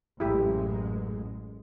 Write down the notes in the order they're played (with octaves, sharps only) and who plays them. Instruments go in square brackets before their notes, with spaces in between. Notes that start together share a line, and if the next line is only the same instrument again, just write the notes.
[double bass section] A1 F#2 G#3 [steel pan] E4 G4